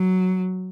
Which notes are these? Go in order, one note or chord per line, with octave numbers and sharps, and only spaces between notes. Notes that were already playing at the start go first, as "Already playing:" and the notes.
Already playing: F#3